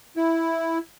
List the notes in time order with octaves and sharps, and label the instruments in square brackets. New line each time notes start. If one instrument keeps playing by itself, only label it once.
[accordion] E4